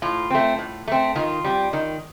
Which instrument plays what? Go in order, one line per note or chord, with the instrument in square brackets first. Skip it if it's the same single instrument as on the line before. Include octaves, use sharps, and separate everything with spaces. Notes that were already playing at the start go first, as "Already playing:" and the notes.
[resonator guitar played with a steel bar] A2 F4
A3 C4
A2
A3 C4
D#3 F4
G3 C4
D#3